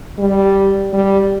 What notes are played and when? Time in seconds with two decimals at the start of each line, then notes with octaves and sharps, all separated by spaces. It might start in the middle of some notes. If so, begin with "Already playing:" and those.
0.18 G3
0.93 G3